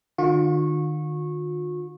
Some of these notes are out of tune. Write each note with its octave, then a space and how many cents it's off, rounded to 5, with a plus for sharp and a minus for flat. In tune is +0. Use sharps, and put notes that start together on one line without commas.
D#3 -45 F4 +45 C#6 -20